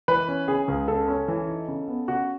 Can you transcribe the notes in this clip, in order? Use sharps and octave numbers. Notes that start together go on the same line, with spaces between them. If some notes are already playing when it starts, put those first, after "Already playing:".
E3 B4
C#4
C#3 G#4
C#2
C#3 A4
C#4
E3
D#4
C#3
B3
C#3 F#4